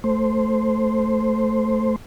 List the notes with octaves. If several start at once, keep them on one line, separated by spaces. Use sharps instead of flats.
A3 C5